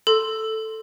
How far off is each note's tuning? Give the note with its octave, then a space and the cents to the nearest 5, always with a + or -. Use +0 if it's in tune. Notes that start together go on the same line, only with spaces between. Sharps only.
A4 +0 C6 +0